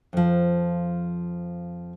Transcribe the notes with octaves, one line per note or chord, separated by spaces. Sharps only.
F2 F3